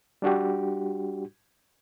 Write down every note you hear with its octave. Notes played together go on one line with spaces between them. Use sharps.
G3 D4 F#4 G4